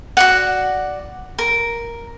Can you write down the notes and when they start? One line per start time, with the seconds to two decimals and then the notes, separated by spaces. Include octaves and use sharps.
0.17 F#4 D5 F#5
1.39 A#4